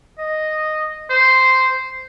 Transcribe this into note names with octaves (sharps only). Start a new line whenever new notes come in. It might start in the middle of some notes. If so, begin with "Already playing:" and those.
D#5
C5